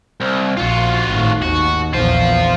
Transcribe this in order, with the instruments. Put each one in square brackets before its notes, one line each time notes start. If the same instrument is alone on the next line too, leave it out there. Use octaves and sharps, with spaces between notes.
[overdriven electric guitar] C2
[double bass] A#1 [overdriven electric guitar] F4 F#4
[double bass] G#1 A2
[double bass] D#2 [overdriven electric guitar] F#4
[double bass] A#1 E2 [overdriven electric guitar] F4 C5